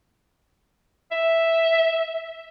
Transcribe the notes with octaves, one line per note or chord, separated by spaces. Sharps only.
E5